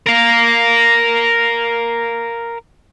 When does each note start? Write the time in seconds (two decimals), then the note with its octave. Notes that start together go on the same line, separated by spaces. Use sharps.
0.06 A#4 F5